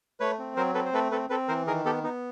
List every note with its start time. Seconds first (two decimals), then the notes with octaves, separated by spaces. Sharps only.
0.20 A3 B4 C#5
0.39 C4
0.56 F#3 A#4 C5
0.75 C4 A4 B4
0.86 C5
0.93 A3 A4 B4
1.11 C4 A4 B4
1.30 C4 A4 B4
1.48 E3 A#4 C5
1.67 D#3 G#4 A#4
1.85 B3 G4 A4
2.03 B3 D#4